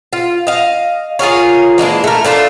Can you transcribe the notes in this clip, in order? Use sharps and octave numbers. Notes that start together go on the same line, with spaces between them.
F4
D#5 F5
F4 G#4 A#4 C#5
E3 G#3 A#3 D4
A3 A#4
A3 D4 E4 F4